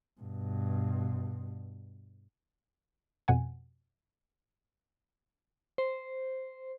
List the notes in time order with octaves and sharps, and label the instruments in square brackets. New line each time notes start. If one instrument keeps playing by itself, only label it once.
[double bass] G2 B2
[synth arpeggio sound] F2 B2 F#5 G#5
[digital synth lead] C5